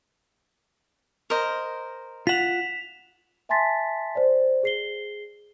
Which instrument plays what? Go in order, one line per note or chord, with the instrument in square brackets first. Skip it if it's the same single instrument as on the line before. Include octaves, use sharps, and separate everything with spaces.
[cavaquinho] A#4 C5 D#5
[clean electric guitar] F4 F#5 [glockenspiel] B6 E7 F7
[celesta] E5 G#5 A5 C6 A6 B6
C5 D5
G#4 C7 G7